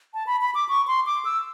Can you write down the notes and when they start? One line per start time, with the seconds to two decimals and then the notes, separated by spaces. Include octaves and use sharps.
0.14 A5
0.27 B5
0.41 B5
0.55 D6
0.69 C#6
0.87 C6
1.06 D6
1.25 E6